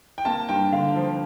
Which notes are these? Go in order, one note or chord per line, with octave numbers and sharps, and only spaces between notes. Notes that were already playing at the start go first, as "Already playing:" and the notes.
G5
A#3 A5
G2 G5
D3 F5
F3